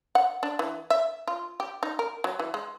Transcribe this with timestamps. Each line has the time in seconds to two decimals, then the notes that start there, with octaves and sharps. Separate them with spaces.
0.15 F#5
0.43 D4
0.59 E3
0.90 E5
1.27 F4
1.60 G4
1.83 D#4
1.99 A#4
2.24 F#3
2.39 E3
2.54 G#3